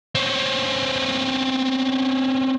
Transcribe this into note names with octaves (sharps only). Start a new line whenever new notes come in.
C4 C#4